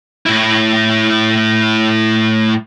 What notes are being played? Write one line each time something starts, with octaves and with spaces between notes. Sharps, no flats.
A2 E4